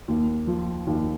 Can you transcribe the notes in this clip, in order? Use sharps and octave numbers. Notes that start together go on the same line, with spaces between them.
D#2
F3
D#2